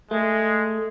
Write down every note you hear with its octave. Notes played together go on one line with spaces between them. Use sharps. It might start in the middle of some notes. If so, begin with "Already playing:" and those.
G#3 A3